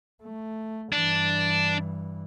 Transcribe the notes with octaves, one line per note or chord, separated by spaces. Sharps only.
A3
G2 E3 D4